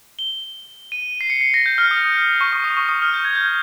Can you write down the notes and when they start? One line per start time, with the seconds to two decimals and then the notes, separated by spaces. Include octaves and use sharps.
0.19 G7
0.92 D#7
1.21 C7
1.30 C#7
1.41 C7
1.54 A#6
1.66 G6
1.78 F6
1.91 D#6
2.41 C#6
2.53 D#6
2.64 D#6
2.77 C#6
2.89 D#6
3.02 F6
3.14 G6
3.25 G#6
3.35 G6